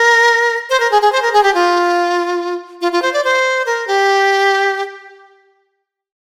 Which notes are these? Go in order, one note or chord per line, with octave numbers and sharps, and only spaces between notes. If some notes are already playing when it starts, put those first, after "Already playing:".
Already playing: A#4
C5
A#4
G#4
G#4
C5
A#4
G#4
G4
F4
F4
F4
C5
D5
C5
A#4
G4